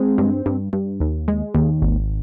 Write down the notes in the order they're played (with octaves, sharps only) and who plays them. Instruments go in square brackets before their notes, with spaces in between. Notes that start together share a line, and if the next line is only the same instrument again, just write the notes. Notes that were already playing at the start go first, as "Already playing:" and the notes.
Already playing: [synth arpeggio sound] G#3 C4
G2
G2
G2
D#2
G#3
D#2
G#1